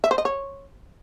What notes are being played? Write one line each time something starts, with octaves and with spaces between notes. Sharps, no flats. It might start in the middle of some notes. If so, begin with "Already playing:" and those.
E5
C5
D#5
C#5